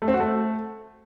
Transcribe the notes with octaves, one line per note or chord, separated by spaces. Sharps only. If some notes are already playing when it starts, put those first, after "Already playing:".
A3
C4
F#4
A3